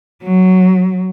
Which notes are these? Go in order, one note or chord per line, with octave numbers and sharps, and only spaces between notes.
F#3